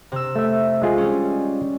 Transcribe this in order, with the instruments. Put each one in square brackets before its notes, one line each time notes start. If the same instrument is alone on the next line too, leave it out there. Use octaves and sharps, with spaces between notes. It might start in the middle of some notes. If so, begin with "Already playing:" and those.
[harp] C3 E6
[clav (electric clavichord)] A3 E5
G#3 F4 G#4
[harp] G3 C#4